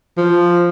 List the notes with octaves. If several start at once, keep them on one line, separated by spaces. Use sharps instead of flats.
F3